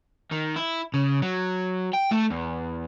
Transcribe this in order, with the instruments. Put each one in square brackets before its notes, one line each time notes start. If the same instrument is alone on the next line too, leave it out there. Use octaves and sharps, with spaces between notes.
[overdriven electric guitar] D#3
E4
C#3
F#3
G5
A3
E2